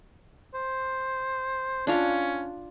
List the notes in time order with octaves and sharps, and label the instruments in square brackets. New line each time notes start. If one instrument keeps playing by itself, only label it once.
[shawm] C5
[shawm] C#4 [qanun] D4 F4 F5